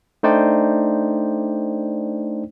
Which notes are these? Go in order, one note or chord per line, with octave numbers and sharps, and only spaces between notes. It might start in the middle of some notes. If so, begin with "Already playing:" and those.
A3 D4 D#4 C5 D5 G5